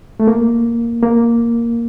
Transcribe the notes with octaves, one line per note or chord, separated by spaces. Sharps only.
A3
A#3
A#3